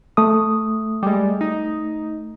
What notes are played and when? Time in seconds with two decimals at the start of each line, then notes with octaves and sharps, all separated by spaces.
0.17 A3 D#6
1.03 G3 G#3
1.41 D#4